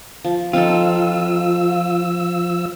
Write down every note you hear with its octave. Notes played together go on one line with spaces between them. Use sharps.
F3
F3 C4 D#4 F4 A4 E6